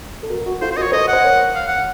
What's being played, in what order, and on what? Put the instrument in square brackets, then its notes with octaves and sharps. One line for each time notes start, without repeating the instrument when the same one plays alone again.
[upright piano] A4
F#4 A#4
F#4
[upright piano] F4 A4 [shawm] C5
[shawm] C5
[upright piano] F#4 A#4 [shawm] D#5
[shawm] C#5
[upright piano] A4 C5 [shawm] D#5
[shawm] F#5
[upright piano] C5
A#4 C#5
[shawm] F5
F#5